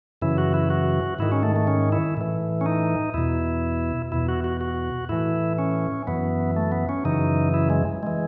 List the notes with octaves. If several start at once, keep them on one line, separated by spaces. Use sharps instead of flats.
F#2 C#3 E3 E4
F#4
E4
F#4
G#2 D#3 E4
C#4
A3
A3
C#4
E4
A2 E3
C#4
D#4
E2 B2 E4
E2 B2 E4
F#4
F#4
F#4
A2 E3 E4
C#4
F#2 E3 B3
A3
B3
C#4
F#2 C#3 E3 D#4
E4
G#3
E3 G#3